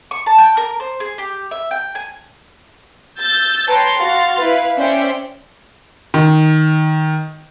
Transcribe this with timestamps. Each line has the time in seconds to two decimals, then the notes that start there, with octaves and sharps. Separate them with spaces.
0.11 C#6
0.26 A5
0.38 G5
0.57 A#4
0.80 C5
1.00 G#4
1.18 G4
1.51 E5
1.71 G5
1.95 G#5
3.20 E6 G6 A6
3.68 B4 C#5 G5 A5 A#5 C6
3.98 F#4 F5 C6 F6 A6
4.38 E4 B4 F5
4.77 C#4 C5 D5 E5 G5
6.14 D#3